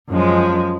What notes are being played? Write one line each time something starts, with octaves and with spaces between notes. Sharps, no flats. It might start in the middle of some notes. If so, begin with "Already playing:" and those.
F#2 F3 G#3